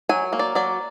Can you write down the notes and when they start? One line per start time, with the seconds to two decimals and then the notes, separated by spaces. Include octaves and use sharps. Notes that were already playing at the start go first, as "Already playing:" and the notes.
0.09 F#3 G#5
0.33 A#3
0.39 D5
0.55 F#3 D5